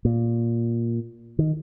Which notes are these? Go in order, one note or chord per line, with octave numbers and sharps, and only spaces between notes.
A#2
D#3